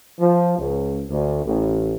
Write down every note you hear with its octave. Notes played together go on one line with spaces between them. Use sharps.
F3
C#2
D2
A1